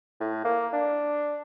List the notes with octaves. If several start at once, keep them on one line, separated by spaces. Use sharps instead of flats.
A2
A#3
D4